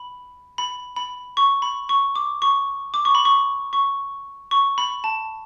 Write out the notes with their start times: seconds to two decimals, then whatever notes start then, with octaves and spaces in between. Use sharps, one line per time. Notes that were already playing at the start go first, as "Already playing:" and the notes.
Already playing: B5
0.58 B5
0.96 B5
1.37 C#6
1.62 B5
1.89 C#6
2.15 D6
2.42 C#6
2.94 D6
3.05 C#6
3.15 B5
3.25 C#6
3.73 C#6
4.51 C#6
4.78 B5
5.04 A5